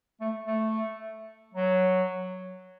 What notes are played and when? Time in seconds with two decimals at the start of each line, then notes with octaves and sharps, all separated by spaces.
0.20 A3
0.47 A3
1.54 F#3